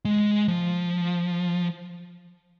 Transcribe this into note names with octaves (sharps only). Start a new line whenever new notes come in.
G#3
F3